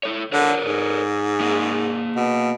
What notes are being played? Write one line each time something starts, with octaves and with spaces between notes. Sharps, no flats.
E4 A4 C#5
D3 A4 A#4 C#5
G#2
A#3 G#4
B2